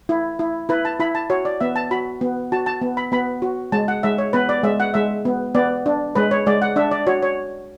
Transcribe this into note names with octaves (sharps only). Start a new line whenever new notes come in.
E4
E4
E4 B4
A5
E4 B5
A5
F#4 C#5
D5
B3 E5
A5
F#4 B5
B3
F#4 A5
A5
B3
B5
B3 B5
F#4
G#3 A5
F#5
G#3 E5
C#5
B3 B4
D5
G#3 E5
F#5
G#3 E5
B3
B3 D5
D4
G#3 B4
C#5
G#3 D5
F#5
D4 E5
D5
F#4 C#5
C#5